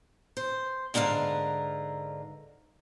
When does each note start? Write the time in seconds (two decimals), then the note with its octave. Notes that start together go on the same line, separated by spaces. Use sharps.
0.37 C5
0.94 G#2 D3 A#4 B4 F5